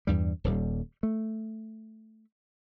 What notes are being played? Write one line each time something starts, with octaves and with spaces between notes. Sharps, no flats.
E2 G2 G3
D#1 D#2 G3
A3